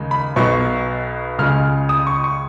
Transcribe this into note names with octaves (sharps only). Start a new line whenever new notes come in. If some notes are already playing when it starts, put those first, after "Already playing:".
Already playing: D#2 C#3 G#3
B5
B1 B2 F#3 C#6
C#2 C#3 G#3 F6
D#6
C#6
C#6